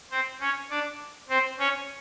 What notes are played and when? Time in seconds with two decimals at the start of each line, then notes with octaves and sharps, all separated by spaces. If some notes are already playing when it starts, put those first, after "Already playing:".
0.11 C4 C5
0.40 C#4 C#5
0.70 D4 D5
1.29 C4 C5
1.58 C#4 C#5